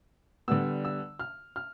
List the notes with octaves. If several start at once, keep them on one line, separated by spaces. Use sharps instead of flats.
D3 G3 B3 E6
E6
F6
F6